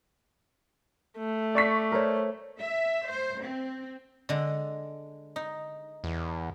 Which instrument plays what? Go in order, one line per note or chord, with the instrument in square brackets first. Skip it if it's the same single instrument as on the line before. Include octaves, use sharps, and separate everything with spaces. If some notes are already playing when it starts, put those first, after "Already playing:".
[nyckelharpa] A3
[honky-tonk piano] D5 C#6 B6
[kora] A#4 C5 C#5
[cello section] E5
C5
C4
[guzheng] D3 G#3
D#4
[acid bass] E2